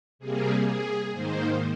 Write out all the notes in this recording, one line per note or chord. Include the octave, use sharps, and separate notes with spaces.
C3 G3 A#3 G#4
G#4
G#2 D#3 A#3 C5